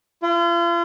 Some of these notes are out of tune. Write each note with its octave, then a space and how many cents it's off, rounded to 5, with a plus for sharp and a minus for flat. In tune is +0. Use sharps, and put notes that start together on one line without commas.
F4 -40